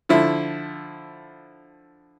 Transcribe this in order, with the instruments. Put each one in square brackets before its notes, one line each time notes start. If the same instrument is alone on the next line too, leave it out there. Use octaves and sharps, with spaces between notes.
[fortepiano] D3 F3 E4